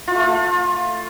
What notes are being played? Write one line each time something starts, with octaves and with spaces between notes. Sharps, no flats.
F4
A3
F4